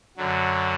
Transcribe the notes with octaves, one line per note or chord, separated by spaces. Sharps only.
F#2 D3 F#3